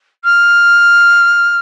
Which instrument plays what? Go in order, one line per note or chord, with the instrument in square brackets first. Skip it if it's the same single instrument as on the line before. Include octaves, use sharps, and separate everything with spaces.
[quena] F6